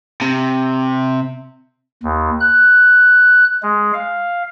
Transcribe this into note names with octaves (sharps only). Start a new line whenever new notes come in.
C3
D#2
F#6
G#3
F5